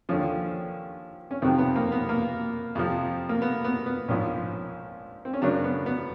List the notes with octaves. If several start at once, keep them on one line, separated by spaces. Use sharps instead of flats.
D#2 D3 F3 C#4
C#4
F2 C3 D#3 F#3 C4
B3
A#3
B3
A#3
F2 C3 F3
A#3
B3
B3
B3
A#1 G#2 F3 C#4
C4
C#4
F#2 C#3 F#3 D4
B3
B3